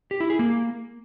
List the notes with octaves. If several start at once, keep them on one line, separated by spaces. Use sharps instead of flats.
G4
E4
G#4
A#3